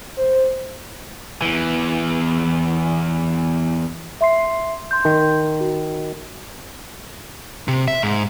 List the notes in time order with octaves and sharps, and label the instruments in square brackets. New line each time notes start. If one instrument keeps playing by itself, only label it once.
[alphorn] C5
[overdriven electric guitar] E2 E3
[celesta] E5 C6 C7
C6 G6
[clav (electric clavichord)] D#3
[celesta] F#4
[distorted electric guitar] C3
E5
G#2